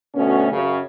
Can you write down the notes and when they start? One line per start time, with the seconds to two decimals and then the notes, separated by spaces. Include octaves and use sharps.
0.15 D2 B2 A3 C#4
0.52 F#2 C#3